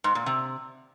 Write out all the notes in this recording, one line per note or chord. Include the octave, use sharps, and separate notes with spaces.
G#2
A#2
C3